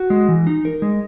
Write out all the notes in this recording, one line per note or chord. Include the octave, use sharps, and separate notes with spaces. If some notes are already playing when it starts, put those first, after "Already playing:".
Already playing: F#4
G#3
E3
D#4
A#4
G#3